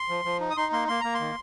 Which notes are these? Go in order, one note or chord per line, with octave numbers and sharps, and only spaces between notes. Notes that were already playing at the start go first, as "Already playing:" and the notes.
Already playing: C6
F3
F3
D#4
D#6
D#4 C6
A#3 C6
A#3 C6
A#3 A#5
C6
D#3